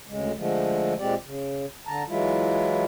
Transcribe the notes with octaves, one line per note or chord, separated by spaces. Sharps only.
D2 C#3 G#3
D3 F3 G#3 A3
A#2 G#3 C4 G4 D5
C#3
D3 A5 A#5
E3 F#3 G#3 E4 F4